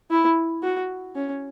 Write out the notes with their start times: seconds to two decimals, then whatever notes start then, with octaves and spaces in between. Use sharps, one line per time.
0.11 E4
0.63 F#4
1.15 C#4